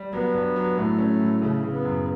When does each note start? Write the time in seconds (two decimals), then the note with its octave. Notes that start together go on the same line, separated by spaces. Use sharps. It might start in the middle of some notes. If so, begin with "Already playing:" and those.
Already playing: G3
0.13 F#3 B3
0.34 G2
0.56 F#3
0.77 A2 A3
0.98 C#4
1.21 A2
1.42 C#3 A3
1.63 C#3
1.73 B3
1.85 F#2